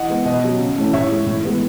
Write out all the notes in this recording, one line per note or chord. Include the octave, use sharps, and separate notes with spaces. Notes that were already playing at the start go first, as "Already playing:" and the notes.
Already playing: E3 D#5 F#5
G#3 B3
B2 D#5
F#3 C#4
C#3
E3 A3 C#4
A2 C#5 E5
G#3 C#4
A2
E3 G#3 B3